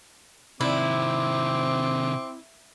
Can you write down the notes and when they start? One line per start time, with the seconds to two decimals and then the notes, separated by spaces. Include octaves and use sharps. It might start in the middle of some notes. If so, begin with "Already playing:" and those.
0.61 C3 D#3 C4 E4 D6